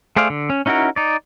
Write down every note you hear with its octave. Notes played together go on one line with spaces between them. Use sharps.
A3 G#4 C5 D5 F5
D3
C#4
C#4 D#4 E4 F#4 A#4
D#4 D5